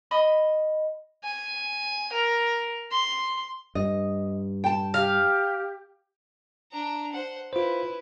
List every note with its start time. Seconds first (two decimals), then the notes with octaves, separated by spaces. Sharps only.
0.11 D#5 B5 D#6
1.24 G#5
2.13 A#4
2.91 C6
3.75 G2 D#5
4.64 G5 A5
4.94 G4 F5
6.72 D4 A#5
7.12 C5 F#5
7.53 E4 F4 B4 C5